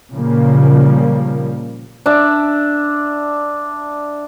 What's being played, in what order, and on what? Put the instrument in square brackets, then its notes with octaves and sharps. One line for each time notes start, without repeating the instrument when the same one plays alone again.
[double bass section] A#2 C#3 F3 G3 A#3
[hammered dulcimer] D4 E5